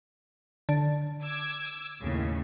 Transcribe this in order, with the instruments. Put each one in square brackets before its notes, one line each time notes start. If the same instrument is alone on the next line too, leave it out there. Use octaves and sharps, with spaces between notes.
[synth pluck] D3
[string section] D6 E6 G#6
D#2 A2 C#3